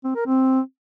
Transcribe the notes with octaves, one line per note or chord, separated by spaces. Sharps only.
C4
A#4
C4